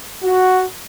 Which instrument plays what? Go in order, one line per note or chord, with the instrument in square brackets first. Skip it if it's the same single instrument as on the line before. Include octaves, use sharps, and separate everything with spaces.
[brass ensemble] F#4